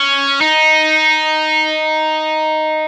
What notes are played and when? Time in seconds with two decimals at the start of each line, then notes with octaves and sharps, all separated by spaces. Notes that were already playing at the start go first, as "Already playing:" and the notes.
Already playing: C#4
0.41 D#4